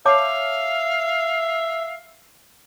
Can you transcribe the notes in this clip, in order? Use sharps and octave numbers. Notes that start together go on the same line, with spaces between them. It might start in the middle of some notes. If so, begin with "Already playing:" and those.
C#5 E5 F5 A5 D6